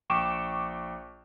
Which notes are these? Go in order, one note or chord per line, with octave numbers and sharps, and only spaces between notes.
A#1 G5 C#6 D6 E7